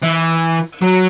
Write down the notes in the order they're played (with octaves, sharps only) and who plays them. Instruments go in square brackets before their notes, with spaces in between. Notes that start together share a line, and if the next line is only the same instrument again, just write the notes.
[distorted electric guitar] E3
F#3